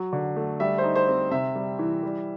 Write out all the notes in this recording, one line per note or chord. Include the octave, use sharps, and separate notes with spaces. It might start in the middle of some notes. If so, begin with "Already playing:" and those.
Already playing: F#3
D3
A3
G3 E5
C5
D#4
C5
C4
C3 E5
G3
E3
G3